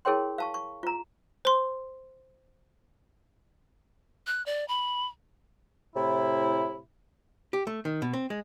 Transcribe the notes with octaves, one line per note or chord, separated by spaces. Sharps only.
E4 G#4 A#4 C#5 G5 C6
F5 A5 C#6
C#6
F4 A#5
C5 C6
F#6
D5
B5
A2 C3 E4
G4
A3
D#3
B2
C4
G#3